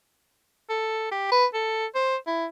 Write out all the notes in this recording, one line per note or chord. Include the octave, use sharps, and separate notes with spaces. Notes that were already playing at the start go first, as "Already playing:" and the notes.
A4
G4
B4
A4
C5
E4